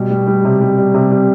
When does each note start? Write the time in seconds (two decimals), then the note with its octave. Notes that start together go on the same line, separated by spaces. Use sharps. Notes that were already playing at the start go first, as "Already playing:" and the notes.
Already playing: B2 G3
0.10 G3
0.27 G3
0.45 C3
0.61 G3
0.78 G3
0.94 C3
1.11 G3